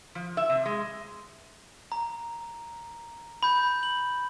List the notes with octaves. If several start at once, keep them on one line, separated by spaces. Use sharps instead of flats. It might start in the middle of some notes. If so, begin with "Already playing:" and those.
F3
E5
C3
G#3
A#5
B5 G6
F#7